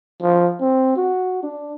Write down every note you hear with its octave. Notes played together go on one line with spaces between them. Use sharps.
F3
C4
F#4
D4